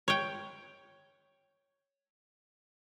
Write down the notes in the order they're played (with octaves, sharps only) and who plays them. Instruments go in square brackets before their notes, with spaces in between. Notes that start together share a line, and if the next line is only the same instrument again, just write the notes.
[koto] C#5 G5